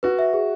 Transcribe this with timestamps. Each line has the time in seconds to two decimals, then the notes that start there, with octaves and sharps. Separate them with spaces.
0.03 F#4 B4
0.19 E5
0.33 G#4